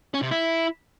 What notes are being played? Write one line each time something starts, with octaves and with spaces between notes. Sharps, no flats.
C#4
C3
E4